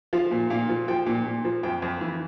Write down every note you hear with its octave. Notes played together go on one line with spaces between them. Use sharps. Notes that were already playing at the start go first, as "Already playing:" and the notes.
F3 F5
A#2
A#2 F5
F3
F3 G5
A#2
A#2
F3
F2 G5
F2
E3